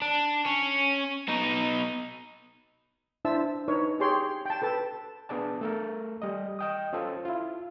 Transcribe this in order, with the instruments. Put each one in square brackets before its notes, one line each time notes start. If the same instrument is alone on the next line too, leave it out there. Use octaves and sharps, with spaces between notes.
[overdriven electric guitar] D4
C#4
B2 D#4
[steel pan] D4 E4 C5 E5 A5 E6
D#4 B4 C#5
G4 G#4 C#5 G5 C6
G5 A5
A4 B4 A5
[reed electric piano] B3 D4 G#4 D5 A5
A3 A4 A#4
G3 D#5
D#5 G5 D#6
C#4 F4 A4 C5
E4 F4